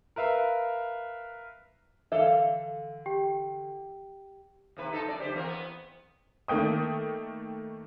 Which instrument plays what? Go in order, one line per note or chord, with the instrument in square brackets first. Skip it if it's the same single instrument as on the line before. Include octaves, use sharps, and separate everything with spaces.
[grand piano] A#4 B4 E5 F5
[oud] D3 E3 F5 [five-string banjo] A4 E5
[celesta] G4 G5
[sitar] D#2 C3 B4
B3 D#4 A4
F#2 D5
D3 G4 C5
E2 C4 A#4
B3
[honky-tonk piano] D#3 A3 A#3 G5 D#6